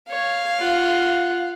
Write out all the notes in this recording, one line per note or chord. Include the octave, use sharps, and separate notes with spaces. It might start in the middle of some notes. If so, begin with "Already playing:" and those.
C#5 F5
F4 F#5